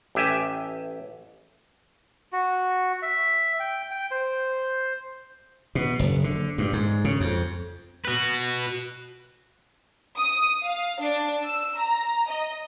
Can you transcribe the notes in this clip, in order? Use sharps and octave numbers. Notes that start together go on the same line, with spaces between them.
A1 G4 E5 G#5
F#4
E5
G5
G5
C5
B2
F#1
D3
G2
G#2
C#3
F2
F#4 B4
D#6
F5
D4
E6
A#5
D#5